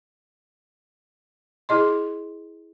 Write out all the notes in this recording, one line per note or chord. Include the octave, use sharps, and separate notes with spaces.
E4 G#4 D#5 C6